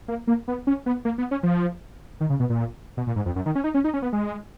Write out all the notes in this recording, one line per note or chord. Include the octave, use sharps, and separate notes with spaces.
A#3
A#3
B3
C#4
B3
A#3
B3
C#4
F3
D#3
C#3
B2
A#2
B2
A#2
G#2
F2
F#2
D#3
C#4
D#4
C#4
D#4
C#4
B3
G#3